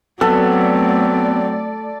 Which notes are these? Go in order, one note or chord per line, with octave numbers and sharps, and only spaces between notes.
F#3 A3 B3 C4 A4 D5